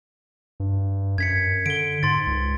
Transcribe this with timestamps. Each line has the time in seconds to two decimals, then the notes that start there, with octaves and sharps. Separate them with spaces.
0.60 G2
1.18 F#2 G#6 B6 C#7
1.66 D3 D7 G7
2.03 G#2 C6 A6
2.27 C#2